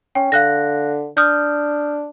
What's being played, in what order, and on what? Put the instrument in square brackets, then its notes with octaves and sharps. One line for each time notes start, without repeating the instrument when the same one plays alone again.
[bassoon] C#4 [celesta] G5
[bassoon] D3 [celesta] F5 F#6 A#6
[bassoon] D4 [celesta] D#6 F6 G6